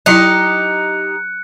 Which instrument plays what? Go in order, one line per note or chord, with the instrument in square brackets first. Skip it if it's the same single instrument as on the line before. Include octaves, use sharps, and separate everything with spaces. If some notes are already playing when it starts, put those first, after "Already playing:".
[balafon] F#3 E4 D#5 [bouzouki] D#4 G4 [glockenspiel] F#6 C#7